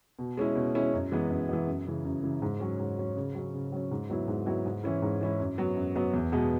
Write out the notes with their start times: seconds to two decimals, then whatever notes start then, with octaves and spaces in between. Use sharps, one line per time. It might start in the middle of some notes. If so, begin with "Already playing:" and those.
0.19 B2
0.37 G#3 C#4 E4
0.56 B2
0.75 G#3 C#4 E4
0.93 F#2
1.12 E3 G#3 B3
1.31 F#2
1.49 E3 G#3 B3
1.67 F#2
1.86 C#3 E3
2.05 F#2
2.23 C#3 E3
2.42 G#2
2.60 F#3 C#4
2.80 G#2
2.98 F#3 C#4
3.16 C#3
3.35 F#3 C#4
3.54 C#3
3.72 F#3 C#4
3.91 G#2
4.10 F#3 B3 E4
4.28 G#2
4.46 F#3 B3 E4
4.66 G#2
4.84 E3 C#4 E4
5.02 G#2
5.21 E3 C#4 E4
5.40 F#2
5.58 F#3 B3
5.76 F#2
5.95 F#3 B3
6.13 E2
6.32 B2 G#3 B3